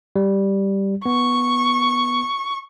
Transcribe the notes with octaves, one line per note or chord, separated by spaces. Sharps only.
G3
B3 C#6